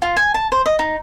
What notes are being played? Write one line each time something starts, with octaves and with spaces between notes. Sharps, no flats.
F4
G#5
A5
C5
D#5
D#4